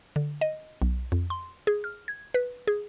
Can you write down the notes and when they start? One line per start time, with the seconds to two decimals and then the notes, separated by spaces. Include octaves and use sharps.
0.16 D3
0.41 D#5
0.82 B1
1.12 F2
1.30 C6
1.67 G#4
1.84 F6
2.08 G#6
2.34 B4
2.67 G#4